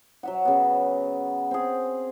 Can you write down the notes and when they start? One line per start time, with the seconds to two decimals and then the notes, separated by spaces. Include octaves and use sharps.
0.23 F#3 E5 F#5
0.45 C#3 B3
1.51 C4 G#4